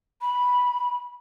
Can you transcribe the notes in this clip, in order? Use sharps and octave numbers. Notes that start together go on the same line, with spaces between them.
B5